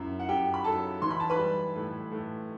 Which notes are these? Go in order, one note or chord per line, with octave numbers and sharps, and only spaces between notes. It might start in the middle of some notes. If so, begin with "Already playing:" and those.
Already playing: F#2 F#3 E4
F#5
F#2 G4 G5
B5
F#3 A4 A5
E3 C6
B5
A5
B4 B5
G3
A2
A2